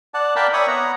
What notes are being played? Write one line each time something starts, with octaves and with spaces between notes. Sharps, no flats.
D5 F#5 A5
A#4 D5 F5 G5 A5 B5
C#5 D5 E5 B5 C#6 D#6
B3 C#5 F#5 A#5